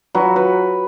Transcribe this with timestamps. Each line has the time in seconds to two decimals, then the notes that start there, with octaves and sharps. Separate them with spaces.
0.15 F#3 B4
0.36 B4